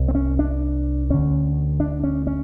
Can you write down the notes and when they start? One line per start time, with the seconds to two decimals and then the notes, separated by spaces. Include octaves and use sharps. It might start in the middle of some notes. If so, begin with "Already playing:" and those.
Already playing: C2 C3
0.08 C4
0.15 C#4
0.39 D4
1.10 D2 D3 C#4
1.80 D4
2.04 C#4
2.27 C#4